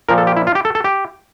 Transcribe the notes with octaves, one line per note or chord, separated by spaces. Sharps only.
A#2 F3 A#4
A4
G4
E4
F4
G4
A4
A4
G4